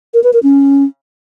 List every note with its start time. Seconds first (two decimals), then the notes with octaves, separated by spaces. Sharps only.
0.14 A#4
0.24 B4
0.33 A#4
0.43 C#4